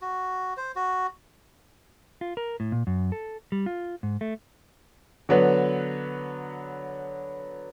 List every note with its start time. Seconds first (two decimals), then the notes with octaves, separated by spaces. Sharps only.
0.01 F#4
0.57 C5
0.76 F#4
2.21 F4
2.37 A#4
2.60 A2
2.72 A#2
2.87 F#2
3.12 A4
3.52 G3
3.66 F4
4.03 G#2
4.21 A3
5.29 D3 F#3 B3 B4